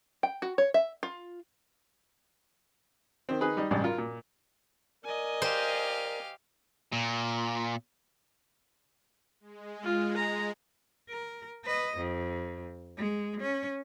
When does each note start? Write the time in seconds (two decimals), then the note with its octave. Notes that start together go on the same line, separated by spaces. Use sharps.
0.23 G5
0.42 F#4
0.58 C#5
0.74 E5
1.03 F4
3.29 D#3 C4
3.41 D#3 D#4 G#4 B4
3.57 G3 D#4
3.71 A1 G2 C#3 G3 G#3 D5
3.84 F4 A#4
3.98 A#2
5.05 A#4 D5 D#5 G#5
5.42 G4 C5 F5
6.92 A#2
9.40 G#3
9.83 F4
10.17 A#5
11.10 A#4
11.65 B4 D#5
11.98 F2
12.97 G#3
13.41 C#4